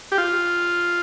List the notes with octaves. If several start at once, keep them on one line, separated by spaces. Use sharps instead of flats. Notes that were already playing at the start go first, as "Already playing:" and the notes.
G4
F4